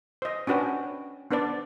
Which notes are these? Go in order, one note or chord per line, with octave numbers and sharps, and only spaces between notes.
C5 D#5
C#4 D4 F#4 B4 G5
B3 D4 B4 C5 D5 A5